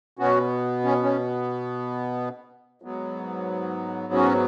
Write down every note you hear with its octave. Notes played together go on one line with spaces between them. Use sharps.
B2 B3 C#4 F#4
C#4
C#4
G#2 F#3 B3
C#4 F#4